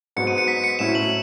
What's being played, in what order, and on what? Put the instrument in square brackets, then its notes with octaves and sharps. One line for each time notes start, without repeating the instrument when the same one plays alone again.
[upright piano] G#2 F#3 B3 [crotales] C#7
[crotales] D#7
C#7
B6
C#7
[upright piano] A2 F#3 C#4 E4 [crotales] E7
[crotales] F#7